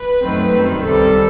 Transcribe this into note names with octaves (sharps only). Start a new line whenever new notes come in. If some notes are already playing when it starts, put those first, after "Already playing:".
Already playing: B4
F#2 D#3 F#3 A3 C4
F#2 D#3 G3 C4
C2 C3 D#3 G3 A4